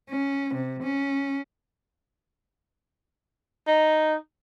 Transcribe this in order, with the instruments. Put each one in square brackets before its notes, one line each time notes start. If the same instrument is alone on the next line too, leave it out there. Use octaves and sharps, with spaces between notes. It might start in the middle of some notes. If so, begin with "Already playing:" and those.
[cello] C#4
C3
C#4
[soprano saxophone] D#4